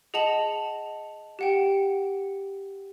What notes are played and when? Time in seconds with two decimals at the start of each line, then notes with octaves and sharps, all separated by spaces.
0.14 G#4 D#5 F#5 A5 F7 F#7
1.39 G4 F#5 G5